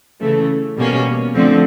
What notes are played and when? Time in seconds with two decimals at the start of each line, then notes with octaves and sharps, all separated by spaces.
0.21 C#3 E3 A3
0.77 B2 G3 A#3 C#4
1.35 D3 F3 A3 C4